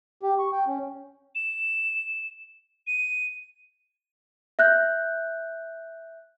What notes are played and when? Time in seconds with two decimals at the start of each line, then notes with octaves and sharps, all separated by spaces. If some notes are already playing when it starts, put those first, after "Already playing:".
0.23 G4
0.39 C#6
0.52 G5
0.67 C#4
1.35 E7
2.87 D#7
4.59 E5 F#6 G6